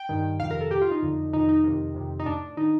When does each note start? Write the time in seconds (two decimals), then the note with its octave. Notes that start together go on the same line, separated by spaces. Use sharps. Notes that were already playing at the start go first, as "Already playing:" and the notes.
Already playing: G5
0.09 G2 D#3
0.40 F2 C3 D#3 F5
0.51 A#4
0.61 A4
0.71 A2 G4
0.82 F4
0.91 D#4
1.02 F2 D3
1.33 F2 C3 D#3 D#4
1.49 D#4
1.64 F2 C3 D#3
1.95 F2 C3 D#3
2.20 D#4
2.26 A2 D4
2.57 D#3 D#4